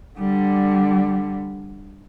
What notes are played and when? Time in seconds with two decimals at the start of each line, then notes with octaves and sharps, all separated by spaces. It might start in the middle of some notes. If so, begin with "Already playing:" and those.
0.19 D3 G3